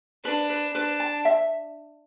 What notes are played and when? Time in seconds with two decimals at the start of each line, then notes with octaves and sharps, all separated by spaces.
0.25 D4 B4
0.49 B4
0.74 D4 B4
1.00 A5
1.25 E5